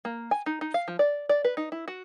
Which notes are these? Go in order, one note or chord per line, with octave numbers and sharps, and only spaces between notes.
A#3
G#5
D#4
D#4
F5
F3
D5
D5
B4
D#4
E4
F#4